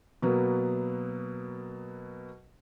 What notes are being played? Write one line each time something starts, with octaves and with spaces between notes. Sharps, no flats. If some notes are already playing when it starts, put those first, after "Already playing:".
B2 F#3 A#3 B3